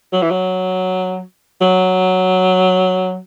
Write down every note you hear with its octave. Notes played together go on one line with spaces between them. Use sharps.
F#3
E3
F#3
F#3